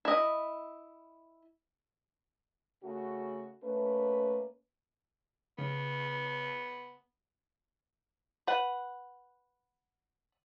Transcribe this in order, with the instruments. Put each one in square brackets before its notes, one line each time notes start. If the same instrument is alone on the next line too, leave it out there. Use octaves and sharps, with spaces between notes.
[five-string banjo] E4 D#5
[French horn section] C#3 A3 F#4
A3 A#3 C#4 B4
[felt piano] C#3 [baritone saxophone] B3
[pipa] B4 F#5